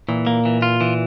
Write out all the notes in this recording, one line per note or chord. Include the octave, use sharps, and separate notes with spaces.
A#2 E3
A#3
E3
F4
E3